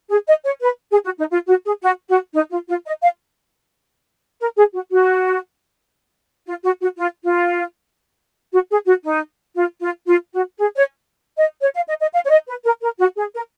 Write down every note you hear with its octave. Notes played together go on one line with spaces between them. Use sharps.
G#4
D#5
C#5
B4
G#4
F#4
D#4
F4
F#4
G#4
F#4
F#4
D#4
F4
F4
D#5
F5
A#4
G#4
F#4
F#4
F4
F#4
F#4
F4
F4
F#4
G#4
F#4
D#4
F4
F4
F4
F#4
G#4
C#5
D#5
C#5
F5
D#5
D#5
F5
C#5
D#5
B4
A#4
A#4
F#4
G#4
A#4